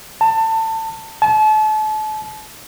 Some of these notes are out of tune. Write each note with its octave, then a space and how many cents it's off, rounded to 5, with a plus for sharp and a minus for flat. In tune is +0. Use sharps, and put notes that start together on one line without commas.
A5 +25
A5 -35